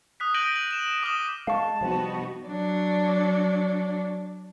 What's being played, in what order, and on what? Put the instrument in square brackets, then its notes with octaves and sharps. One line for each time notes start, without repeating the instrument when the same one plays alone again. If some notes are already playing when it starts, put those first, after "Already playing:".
[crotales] D#6 F#6 B6
G6 A#6 D7 D#7 F#7 G7
F#7
E7 F#7
D6 D#6 F6 G7
[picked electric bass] G#3 [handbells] F5 C#6 [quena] A5
[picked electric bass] C3 F3 G3 [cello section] B3 D#4 F#4
[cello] F#3 D4